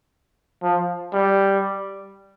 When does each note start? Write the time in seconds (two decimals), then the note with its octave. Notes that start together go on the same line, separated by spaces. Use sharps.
0.63 F3
1.14 G3